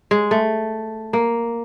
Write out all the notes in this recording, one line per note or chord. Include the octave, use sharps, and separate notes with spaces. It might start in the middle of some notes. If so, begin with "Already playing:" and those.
G#3
A3
A#3